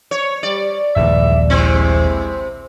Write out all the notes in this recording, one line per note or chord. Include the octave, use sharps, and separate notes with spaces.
C#5
G3 D5
D#1 A#1 D#2 G#2 E3 E5
C3 G#3 C4 E4